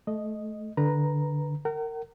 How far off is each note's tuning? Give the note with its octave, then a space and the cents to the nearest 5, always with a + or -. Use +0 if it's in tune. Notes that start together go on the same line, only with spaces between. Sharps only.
A3 -20 D#5 +0
D3 +0 B4 -10 A#5 +0
A#4 -25 F#5 +45